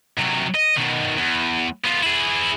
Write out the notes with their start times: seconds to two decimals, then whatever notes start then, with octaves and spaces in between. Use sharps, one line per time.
0.18 C3 F#3
0.54 D#5
0.76 B2 D#3
1.17 E2
1.85 B3 F4
2.03 E4 G#4